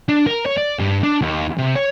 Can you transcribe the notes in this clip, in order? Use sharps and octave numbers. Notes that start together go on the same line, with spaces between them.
D4
A#4
C#5
D5
G2
D4
D#2
C3
C#5